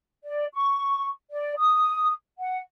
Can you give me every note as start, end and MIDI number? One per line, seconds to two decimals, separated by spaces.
0.24 0.45 74
0.54 1.08 85
1.30 1.53 74
1.57 2.11 87
2.38 2.59 78